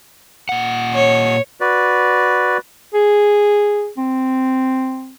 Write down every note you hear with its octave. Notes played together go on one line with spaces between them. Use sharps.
A#2 F#5
C#5
F#4 B4 D5
G#4
C4